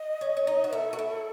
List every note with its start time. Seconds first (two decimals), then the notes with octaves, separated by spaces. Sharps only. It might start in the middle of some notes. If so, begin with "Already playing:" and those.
Already playing: D#5
0.21 C#4
0.37 C#4
0.47 D#4
0.64 F#4
0.73 E4 A4
0.93 F#4
0.99 E4